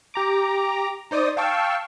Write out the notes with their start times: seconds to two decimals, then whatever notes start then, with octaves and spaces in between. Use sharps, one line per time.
0.14 G4 A#5 D6
1.11 D#4 C5 D5 D#6
1.37 F5 G5 A5 C#6 E6